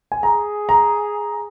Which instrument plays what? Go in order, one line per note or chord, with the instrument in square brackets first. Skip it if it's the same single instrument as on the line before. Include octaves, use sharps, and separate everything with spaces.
[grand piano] G#5
[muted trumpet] G#4 [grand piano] A#5
[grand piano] A#5